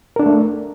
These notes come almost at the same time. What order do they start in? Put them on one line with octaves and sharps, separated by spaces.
A#4 D4 A4 A3